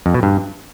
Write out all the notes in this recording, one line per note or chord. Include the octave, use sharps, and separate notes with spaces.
F2
B2
G2